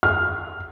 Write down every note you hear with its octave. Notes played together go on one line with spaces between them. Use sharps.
F6